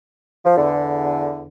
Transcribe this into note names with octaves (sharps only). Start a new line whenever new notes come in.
F3
E2 D3